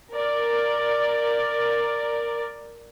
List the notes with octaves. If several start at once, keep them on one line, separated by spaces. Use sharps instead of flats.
A#4 D5